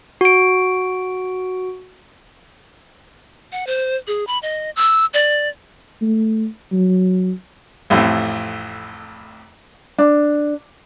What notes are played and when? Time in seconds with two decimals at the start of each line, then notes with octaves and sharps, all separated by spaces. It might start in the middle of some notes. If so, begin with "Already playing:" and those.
0.21 F#4 D7
3.52 F#5
3.67 C5
4.08 G#4
4.27 B5
4.43 D#5
4.76 E6
5.14 D5
6.02 A3
6.72 F#3
7.90 A1 F2 A2
9.98 D4